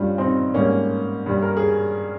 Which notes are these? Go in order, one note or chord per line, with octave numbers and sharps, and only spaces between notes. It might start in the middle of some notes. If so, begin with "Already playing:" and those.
Already playing: G2 G3 C#4 F4
C4 D#4
G#2 G3 A#3 C#4
G2 G3
A#4
G#4